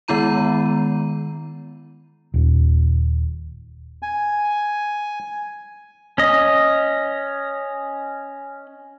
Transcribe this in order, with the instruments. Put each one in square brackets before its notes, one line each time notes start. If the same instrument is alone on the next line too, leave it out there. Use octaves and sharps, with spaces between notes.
[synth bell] D#3 G#3 B3 E4 A#5 D#7
[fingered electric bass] D#1
[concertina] G#5
[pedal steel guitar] C#4 D#5